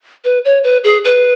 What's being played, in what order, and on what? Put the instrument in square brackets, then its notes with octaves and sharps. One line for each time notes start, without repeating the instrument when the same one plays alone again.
[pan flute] B4
C#5
B4
G#4
B4